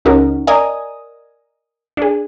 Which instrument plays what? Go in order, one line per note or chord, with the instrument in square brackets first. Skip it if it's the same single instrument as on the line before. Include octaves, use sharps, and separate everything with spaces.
[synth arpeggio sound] C#2 C#3 C#4 D#4 F#4 A#4
A#4 D5 D#5 G#5 A#5 D#6
D4 G#4